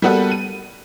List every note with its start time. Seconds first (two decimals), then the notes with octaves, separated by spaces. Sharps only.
0.02 G3 A#3 B3 F#4 A4 B4
0.31 D#7